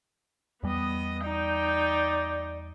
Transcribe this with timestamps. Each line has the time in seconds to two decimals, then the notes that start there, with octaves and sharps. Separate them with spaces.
0.63 E2 G3 B3 D#5
1.25 D#4 D5 G5